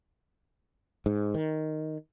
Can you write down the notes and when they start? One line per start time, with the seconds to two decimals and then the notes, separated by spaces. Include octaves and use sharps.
1.06 G#2
1.34 D#3